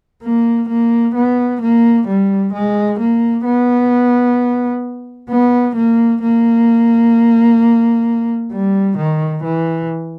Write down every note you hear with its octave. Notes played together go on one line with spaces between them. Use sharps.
A#3
A#3
B3
A#3
G3
G#3
A#3
B3
B3
A#3
A#3
G3
D#3
E3